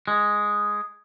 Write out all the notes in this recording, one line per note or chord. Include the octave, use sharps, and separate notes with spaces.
G#3